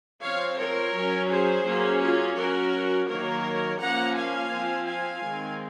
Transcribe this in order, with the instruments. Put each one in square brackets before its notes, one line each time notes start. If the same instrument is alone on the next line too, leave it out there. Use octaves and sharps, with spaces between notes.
[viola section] F3 C4 C#5 F5
A#4 C#5
F#3 C#4
G#4 C5
F#3 A#3 C#4
F4 G#4
F#3 C#4 F#4 A#4
D#3 F#3 A#3 A#4 C#5
F3 A#3 C#4 F#5 A#5
F5 G#5
F3 C4
F5 G#5
D#3 G#3 C4